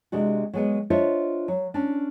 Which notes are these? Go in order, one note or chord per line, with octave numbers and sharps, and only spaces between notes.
C3 G#3 D4 F#4
F#3 G#3 B3
D4 F4 C5 C#5 D#5 E5
F#3
C#4 D4